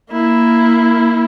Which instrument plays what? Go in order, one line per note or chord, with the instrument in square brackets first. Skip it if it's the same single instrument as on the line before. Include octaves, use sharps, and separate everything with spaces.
[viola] A#3 E4